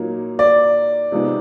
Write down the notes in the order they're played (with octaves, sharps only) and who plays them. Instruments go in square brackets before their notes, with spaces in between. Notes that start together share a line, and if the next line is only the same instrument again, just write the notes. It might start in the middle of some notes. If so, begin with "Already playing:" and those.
Already playing: [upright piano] A#2 F#3 A#3 D#4
[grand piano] D5
[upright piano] C3 F3 G#3 B3 D#4